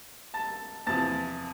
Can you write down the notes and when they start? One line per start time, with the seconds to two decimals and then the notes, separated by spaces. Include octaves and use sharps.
0.34 A5 A6
0.86 E2 C3 F3 A5 A6